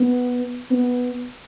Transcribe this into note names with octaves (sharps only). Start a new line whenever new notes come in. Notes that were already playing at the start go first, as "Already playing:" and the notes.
Already playing: B3
B3